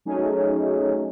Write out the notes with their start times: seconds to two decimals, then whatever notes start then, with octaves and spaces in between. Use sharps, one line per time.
0.05 F#3 A3 C#4 D#4 G#4